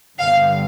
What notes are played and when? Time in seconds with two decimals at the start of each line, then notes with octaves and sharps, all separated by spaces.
0.18 G2 D3 G3 B3 F5